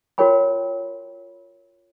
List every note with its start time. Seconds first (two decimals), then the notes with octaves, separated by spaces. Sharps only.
0.18 F4 F#4 A#4 C#5 G5 B5